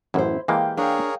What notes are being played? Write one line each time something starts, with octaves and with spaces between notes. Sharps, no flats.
A1 F#2 E4 C5
E3 G#3 A#3 G4 F5 G5
D4 G#4 A#4 C#5 F5 G5